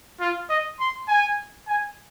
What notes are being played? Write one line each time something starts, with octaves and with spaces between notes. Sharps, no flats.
F4
D#5
C6
G#5
G#5